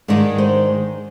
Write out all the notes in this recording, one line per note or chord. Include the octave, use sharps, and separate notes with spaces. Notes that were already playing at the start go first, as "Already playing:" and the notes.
G#2 D#3 G#3 D4 D5
C5